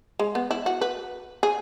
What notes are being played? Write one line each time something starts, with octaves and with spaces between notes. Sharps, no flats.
G#3
B3
E4
F#4
B4
G#4